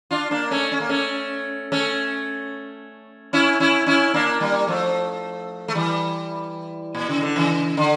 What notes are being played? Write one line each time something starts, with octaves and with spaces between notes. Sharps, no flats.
D4 F4
A#3 D4
A3 C#4
C#4
A#3
A3 C#4
A3 C#4
C#4 E4
C#4 E4
C#4 E4
A#3 D4
G3 A#3
F3 A3
A3
E3 G3
A#2
C#3
D3
C#3 E3
D3